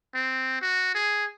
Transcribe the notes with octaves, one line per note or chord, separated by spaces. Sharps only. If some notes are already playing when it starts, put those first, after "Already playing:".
C4
F#4
G#4